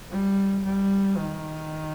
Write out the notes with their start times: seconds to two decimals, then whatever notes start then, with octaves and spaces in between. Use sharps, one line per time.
0.10 G3
0.64 G3
1.17 D#3